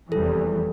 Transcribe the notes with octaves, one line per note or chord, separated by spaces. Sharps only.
F1 E2 E3 G3 A4